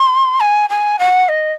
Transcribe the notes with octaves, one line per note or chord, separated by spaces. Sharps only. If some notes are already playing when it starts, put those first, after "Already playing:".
Already playing: C6
G#5
G#5
F#5
D#5